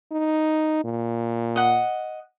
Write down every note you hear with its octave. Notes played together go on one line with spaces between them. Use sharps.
D#4
A#2
D#5 F#5